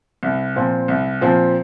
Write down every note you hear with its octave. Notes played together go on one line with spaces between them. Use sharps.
C2
A#2 F3 C4
C2
A#2 F3 C4